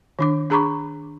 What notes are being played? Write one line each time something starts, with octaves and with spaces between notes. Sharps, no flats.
D#3 D4 D6
D4 G#4 A#5 B5 C#6 D6